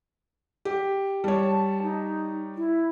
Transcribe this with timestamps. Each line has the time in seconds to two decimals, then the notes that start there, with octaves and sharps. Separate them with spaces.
0.65 G4
1.24 G3 C#5 A5
1.83 D#4
2.56 E4